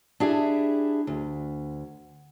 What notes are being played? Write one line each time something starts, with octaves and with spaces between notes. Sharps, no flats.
D4 E4 G4 G#4 E5
D2